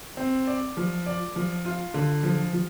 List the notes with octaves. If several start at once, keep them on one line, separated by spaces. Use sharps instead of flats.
C4
D5
F3
D5
F3
F4
D3
F3
F3